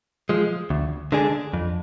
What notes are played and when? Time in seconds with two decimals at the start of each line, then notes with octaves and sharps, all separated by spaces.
0.29 F3 G#3
0.70 D2
1.12 D3 G#3 D4 G#4
1.53 F2